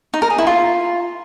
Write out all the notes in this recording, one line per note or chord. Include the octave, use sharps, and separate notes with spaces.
D#4
A#4
G#4
E4
F4